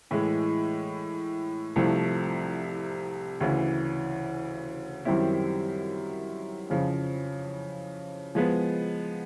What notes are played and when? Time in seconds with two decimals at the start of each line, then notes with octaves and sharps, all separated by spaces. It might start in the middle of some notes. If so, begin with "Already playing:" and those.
0.11 A2 E3 G#3
1.76 C2 C3 F3 A3
3.41 D2 C#3 E3
5.05 F#2 D#3 G3 C4 E4
6.70 F2 C#3 F3
8.35 F3 G#3 B3